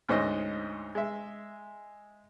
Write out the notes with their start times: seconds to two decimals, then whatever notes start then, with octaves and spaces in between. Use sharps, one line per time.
0.09 D2 G#2 C#4 C5 D#5
0.95 G#3 E5